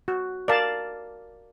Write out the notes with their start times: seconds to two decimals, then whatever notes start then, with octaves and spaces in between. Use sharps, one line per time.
0.08 F#4
0.48 A#4 D5 F5 A5